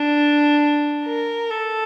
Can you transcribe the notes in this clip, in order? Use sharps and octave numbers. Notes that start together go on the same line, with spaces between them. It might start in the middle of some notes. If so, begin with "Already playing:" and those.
Already playing: D4
A#4
A4